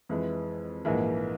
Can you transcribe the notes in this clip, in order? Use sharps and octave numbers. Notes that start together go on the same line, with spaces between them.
F2 E3 G#3
A#1 G#2 E3 A#3